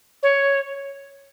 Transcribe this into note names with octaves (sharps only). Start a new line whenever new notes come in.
C#5